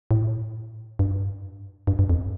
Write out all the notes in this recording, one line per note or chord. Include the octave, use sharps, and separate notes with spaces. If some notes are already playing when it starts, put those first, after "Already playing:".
A2
G2
G2
G2
F2